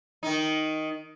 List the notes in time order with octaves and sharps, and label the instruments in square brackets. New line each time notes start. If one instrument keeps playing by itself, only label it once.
[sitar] D#3 D#4